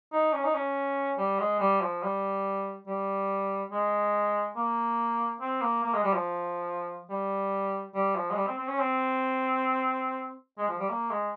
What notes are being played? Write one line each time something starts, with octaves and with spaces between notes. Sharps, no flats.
D#4
C#4
D#4
C#4
G3
G#3
G3
F3
G3
G3
G#3
A#3
C4
A#3
A#3
G#3
G3
F3
G3
G3
F3
G#3
G3
C4
C4
C#4
C4
G#3
F3
G3
A#3
G#3